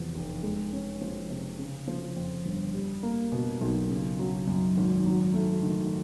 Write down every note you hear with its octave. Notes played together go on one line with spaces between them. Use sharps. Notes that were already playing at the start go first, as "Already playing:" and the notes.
Already playing: E2 C3 F3
F1
G#3
C#4
F3
C3
C#3
F3
F2
G1
G3
A#3
B2
B1
C#3
F#3
F#2
G#1
F#3
A3
D#3